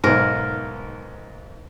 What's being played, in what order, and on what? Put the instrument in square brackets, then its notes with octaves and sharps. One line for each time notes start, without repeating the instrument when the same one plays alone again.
[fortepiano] B1 G#2 [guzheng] A#4